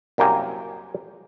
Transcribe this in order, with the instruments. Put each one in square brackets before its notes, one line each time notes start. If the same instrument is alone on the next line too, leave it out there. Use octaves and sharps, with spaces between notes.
[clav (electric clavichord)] C2 F#2 A#3 G5 G#5 A#5